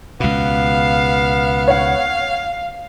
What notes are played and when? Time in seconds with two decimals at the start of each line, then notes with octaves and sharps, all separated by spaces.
0.20 C#2 B2 B3 F5
1.68 C#5 F5 F#5